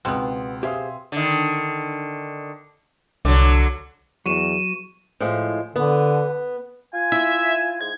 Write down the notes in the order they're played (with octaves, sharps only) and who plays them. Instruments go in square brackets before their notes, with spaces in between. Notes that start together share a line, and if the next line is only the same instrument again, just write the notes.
[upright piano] C#2 [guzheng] B2 B3 [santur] C4
[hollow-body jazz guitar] G4 G#4 C5 [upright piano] E5 F5 D#6
[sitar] D3 D#3
[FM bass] C2 [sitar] D3 F#3
[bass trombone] E2 [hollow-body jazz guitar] F#3 [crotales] C#6 D#7 E7
[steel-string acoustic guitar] A2 F3 G#3
[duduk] D3 [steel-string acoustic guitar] B3
[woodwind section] F4 [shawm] G#5
[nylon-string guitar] E4 [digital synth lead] E5
[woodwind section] G#2 [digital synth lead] G#6